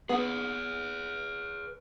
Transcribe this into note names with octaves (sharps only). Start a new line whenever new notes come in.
B3 G#4 B4